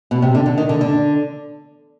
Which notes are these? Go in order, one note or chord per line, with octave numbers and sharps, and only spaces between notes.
B2
C3
D3
D3
D#3
D3
D3